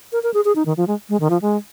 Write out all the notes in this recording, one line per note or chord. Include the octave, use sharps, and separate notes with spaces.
A#4
A#4
G#4
G#4
D#4
D#3
F3
G#3
G#3
D#3
F3
G#3